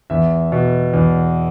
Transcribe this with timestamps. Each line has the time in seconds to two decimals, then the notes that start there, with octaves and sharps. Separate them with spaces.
0.10 E2 E5
0.52 B2
0.93 E2